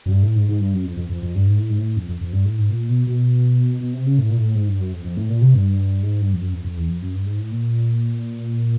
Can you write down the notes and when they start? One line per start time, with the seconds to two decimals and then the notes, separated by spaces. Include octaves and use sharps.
0.06 F#2
0.11 G2
0.23 A2
0.35 G#2
0.49 G#2
0.61 G2
0.73 F#2
0.85 F2
0.97 F2
1.10 F2
1.23 F2
1.35 G2
1.47 G#2
1.59 A2
1.70 G#2
1.78 A2
1.97 F2
2.09 F2
2.21 F2
2.33 G2
2.45 A2
2.58 G#2
2.70 A#2
2.89 B2
3.07 B2
3.81 B2
3.93 C3
4.06 C#3
4.18 A2
4.30 A#2
4.37 A2
4.55 G#2
4.68 G2
4.80 F#2
4.92 F2
5.05 F2
5.17 A2
5.29 A#2
5.42 C3
5.54 G2
6.03 G#2
6.21 G2
6.33 F2
6.41 F#2
6.53 F2
6.65 F2
6.77 E2
6.89 F2
7.02 F#2
7.14 G2
7.26 G#2
7.39 A2
7.51 A#2